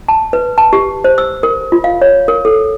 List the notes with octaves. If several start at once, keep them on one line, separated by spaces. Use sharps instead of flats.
A5
B4
A5
G4
C5
E6
A#4
F4
F5
C#5
A#4
A4